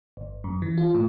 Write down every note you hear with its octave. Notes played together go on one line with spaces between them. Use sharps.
G1
F#2
E3
F4
A2